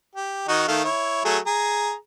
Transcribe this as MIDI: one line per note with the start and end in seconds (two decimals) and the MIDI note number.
0.16 0.43 67
0.48 0.68 51
0.48 0.68 63
0.48 0.68 66
0.68 0.84 51
0.68 0.84 57
0.68 0.84 77
0.85 1.24 64
0.85 1.24 73
1.25 1.38 54
1.25 1.38 57
1.25 1.38 68
1.47 1.93 68
1.47 1.93 82